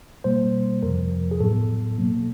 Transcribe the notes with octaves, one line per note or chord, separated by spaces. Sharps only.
B2 G3 A#3 C5
F2 C3 F3 A#4
G#4
A2 F#3 B3 A4
B2 F#3 A#3